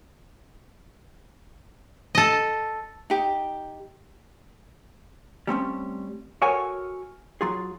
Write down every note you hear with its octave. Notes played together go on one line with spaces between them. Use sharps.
A4 D#5
D#4 G4
G3 A3 C4 C#4
F#4 A4 A#4 C#5 F#5 G#5
F#3 F4 G#4